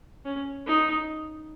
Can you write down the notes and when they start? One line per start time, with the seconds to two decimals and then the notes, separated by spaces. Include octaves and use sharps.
0.25 C#4
0.66 D#4